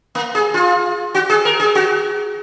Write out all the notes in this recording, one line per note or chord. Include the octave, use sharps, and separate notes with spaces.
A#3
G#4
F4
F#4
G#4
A#4
G#4
F#4